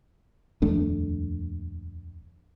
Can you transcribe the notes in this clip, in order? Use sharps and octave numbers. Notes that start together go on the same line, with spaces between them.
D#1 F2 A3 D4